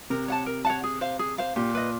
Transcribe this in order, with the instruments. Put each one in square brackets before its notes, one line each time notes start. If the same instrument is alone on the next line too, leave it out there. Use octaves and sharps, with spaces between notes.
[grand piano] C3 [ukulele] A#4
[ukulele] C#5 F#5 A5
A#4
C#5 F#5 A5
G#4
C5 F5
G#4
C5 F5
[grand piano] A#2 [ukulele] G4
[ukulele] B4 D#5